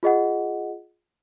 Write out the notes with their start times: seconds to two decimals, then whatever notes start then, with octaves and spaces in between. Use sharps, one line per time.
0.03 F4 G#4 D#5 F#5